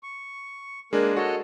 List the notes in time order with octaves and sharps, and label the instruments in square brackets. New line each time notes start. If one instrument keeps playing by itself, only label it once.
[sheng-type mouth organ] C#6
[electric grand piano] G#3 D4 [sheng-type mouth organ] A#3 G#4 A#4
[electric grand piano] F#4 [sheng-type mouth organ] A4 C#5 D#5